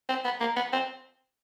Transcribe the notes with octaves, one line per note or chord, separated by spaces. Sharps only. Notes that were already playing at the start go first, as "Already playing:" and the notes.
C4
B3
A#3
B3
C4